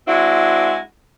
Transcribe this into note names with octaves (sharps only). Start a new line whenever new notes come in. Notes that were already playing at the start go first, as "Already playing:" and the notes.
G#3 C4 D4 E4 F#4